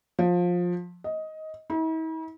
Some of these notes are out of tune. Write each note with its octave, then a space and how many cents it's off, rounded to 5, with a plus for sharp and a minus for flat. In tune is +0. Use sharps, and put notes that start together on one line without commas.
F3 +20
D#5 +15
E4 -45